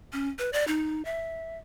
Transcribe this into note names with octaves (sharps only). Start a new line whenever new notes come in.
C#4
B4
D5
D#4
E5